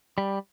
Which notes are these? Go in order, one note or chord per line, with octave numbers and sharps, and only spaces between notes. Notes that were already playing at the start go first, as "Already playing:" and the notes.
G3